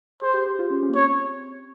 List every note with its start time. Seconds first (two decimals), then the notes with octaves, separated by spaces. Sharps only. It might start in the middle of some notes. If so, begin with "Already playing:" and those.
0.22 G#4 C5
0.34 G4
0.46 G4
0.59 F4
0.70 C#4
0.83 C#4
0.89 A#3
0.94 C4 C#5